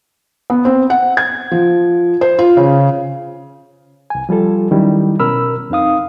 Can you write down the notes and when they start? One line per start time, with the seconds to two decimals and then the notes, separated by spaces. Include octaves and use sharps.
0.50 B3
0.65 C4
0.90 F#5
1.17 G#6
1.52 F3
2.21 C5
2.39 F4
2.57 C#3
4.10 C2 G#5
4.29 F3 G3 F4 A4
4.71 D#3 F#3 G3 C#4 E4
5.19 B2 C#4 A#4 B5 E6 F6
5.70 F2 C4 D#4 F5 D#6